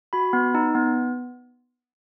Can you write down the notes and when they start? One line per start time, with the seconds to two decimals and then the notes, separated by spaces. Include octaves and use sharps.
0.13 F#4 B5
0.33 B3
0.55 D#4
0.75 B3